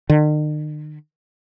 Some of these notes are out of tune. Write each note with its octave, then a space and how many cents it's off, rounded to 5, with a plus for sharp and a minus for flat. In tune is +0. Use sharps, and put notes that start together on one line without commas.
D#3 -45